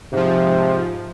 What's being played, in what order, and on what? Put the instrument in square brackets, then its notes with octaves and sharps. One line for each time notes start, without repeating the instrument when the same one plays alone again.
[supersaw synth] G#2 F3 [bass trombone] C3